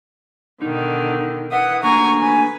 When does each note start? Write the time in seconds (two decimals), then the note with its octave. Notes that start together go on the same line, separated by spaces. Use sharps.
0.62 B2 D3 D#3 D#4
1.52 B4 E5 F#5 D#6
1.83 A3 A#3 D4 G#5 A#5 C#6
2.22 B4 G#5